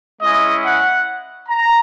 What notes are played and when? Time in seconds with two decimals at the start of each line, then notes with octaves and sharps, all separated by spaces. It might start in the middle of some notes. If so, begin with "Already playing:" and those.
0.22 G#3 C#4 E4 D#5
0.65 F#5
1.49 A#5